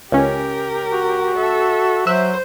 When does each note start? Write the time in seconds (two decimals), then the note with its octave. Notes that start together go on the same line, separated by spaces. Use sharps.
0.12 C#2 C#4 G4 A#4
0.92 F#4
1.37 A4 E5
2.07 F#3 C5 E5 F#6